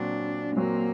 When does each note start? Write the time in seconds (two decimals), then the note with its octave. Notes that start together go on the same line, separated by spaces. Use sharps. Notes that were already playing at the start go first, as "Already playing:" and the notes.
Already playing: A#2 F#3 C4 D4 F#4
0.56 A#2 F#3 A#3 C4 F#4